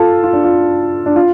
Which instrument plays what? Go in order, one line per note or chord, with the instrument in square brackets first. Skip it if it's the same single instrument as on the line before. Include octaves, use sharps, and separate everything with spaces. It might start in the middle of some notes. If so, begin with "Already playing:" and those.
Already playing: [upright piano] F4 A4
F4
D4
F4
D4
F4